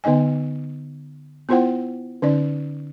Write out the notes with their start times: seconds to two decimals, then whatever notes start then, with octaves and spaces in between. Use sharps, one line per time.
0.04 D3 B3 D#4 D#5 G#5
1.49 B3 E4 F4 C5 F#5 G5
2.22 D3 C#4 D#4 D5